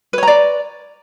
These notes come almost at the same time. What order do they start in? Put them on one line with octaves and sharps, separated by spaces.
B4 C#5 A#5 D5